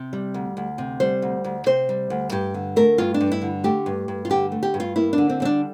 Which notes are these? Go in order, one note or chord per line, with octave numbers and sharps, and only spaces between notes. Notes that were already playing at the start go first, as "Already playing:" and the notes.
Already playing: C3
G3
D2
D2
C3
G3 C5
D2
D2
C3 C5
G3
D2
G2 G4
D3
A3 A#4
G2 F4
D4
G2
E4
D3
A3 G4
G2
G2
F4
D3 G4
A3
G4
G2
F4
A#3 E4
D4
D3
C4
G3 C4
D4